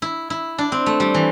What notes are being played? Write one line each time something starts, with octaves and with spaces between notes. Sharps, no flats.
E4
E4
D4
C4
A3
G3
E3